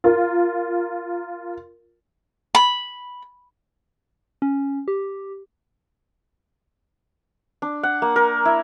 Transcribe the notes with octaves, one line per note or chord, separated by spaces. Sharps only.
F4 A#4
B5
C#4
G4
D4
F#5
A#3
A#4
E4